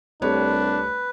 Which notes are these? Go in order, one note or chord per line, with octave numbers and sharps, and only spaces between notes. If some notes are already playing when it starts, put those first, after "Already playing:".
C2 A3 D4 G4 B4 C#5